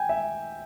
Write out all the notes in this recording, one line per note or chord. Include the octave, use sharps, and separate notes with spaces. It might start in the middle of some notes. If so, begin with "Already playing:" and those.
Already playing: G5 G#5
E5